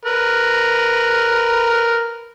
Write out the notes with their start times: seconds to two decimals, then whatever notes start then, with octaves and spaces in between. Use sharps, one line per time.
0.05 A#4 B4